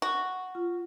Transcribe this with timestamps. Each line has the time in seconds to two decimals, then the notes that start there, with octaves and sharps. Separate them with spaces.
0.02 F#4
0.55 F4